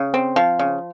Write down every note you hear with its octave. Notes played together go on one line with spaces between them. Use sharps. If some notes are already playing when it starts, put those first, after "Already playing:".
Already playing: C#3
C4
F3
C#3